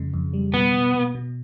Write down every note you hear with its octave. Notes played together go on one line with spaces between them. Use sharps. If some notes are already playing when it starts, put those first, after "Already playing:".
Already playing: F2 C#3 G#3
F2
G3
B2 B3
B2
B2
B2